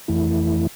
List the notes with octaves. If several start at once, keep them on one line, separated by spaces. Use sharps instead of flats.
F2 E3 A3 E4